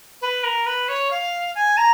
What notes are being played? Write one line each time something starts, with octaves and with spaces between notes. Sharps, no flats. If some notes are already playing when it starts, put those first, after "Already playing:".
B4
A#4
B4
C#5
F5
G#5
A#5